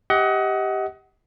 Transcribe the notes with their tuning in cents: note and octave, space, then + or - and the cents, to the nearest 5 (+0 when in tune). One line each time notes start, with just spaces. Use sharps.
G4 +0 D#5 +30 F#5 +15